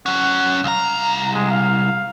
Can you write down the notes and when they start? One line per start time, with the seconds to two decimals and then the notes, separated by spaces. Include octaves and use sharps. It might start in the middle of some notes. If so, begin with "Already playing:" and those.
0.06 F#3 C#4 F#5
0.64 C2 F5 A#5
1.35 G#3
1.51 F5